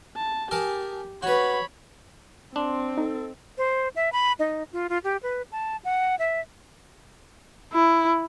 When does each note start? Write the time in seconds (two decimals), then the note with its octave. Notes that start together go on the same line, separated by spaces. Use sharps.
0.17 A5
0.51 G4 G#4 A#4 A5
1.23 F#4 B4 C#5 B5
2.56 C4 D4 C6
2.97 D#4 A4
3.58 C5
3.96 E5
4.12 B5
4.39 D#4
4.73 F4
4.89 F4
5.04 G4
5.23 B4
5.52 A5
5.85 F#5
6.19 E5
7.73 E4